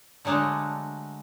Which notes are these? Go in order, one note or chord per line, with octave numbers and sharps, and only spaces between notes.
D3 F#3 G#3 A3 D4